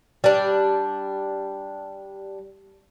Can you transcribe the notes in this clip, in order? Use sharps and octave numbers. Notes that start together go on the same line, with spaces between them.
G3 D4